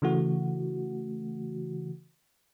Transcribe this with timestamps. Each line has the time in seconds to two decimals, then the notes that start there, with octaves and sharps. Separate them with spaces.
0.02 C#3 E3 A3 F#4